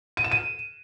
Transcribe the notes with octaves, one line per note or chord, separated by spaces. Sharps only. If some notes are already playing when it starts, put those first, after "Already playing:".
D#7
E7
D#7